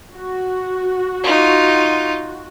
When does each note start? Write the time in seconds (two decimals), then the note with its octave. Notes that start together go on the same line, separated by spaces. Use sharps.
0.14 F#4
1.24 D#4 F4